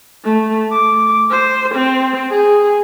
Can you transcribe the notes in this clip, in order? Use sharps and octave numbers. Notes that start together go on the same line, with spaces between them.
A3
D6
C5
C4
G#4